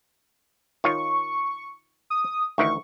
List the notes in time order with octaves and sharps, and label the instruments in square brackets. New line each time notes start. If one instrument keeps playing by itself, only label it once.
[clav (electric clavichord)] D#3 F4 C#5 [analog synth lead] C#6
[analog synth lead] D#6
[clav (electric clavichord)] D2 D#3 E3 [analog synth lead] C#6